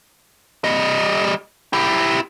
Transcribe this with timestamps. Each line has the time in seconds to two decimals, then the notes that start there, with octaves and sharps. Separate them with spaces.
0.64 G3 D#5
1.73 E4 G4